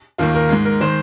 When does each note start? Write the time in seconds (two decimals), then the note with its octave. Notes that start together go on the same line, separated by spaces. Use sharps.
0.18 D#2 D#3 A#3 F4
0.35 A#4
0.49 G#2 G#3
0.65 A#4
0.81 D#3 G#3 C5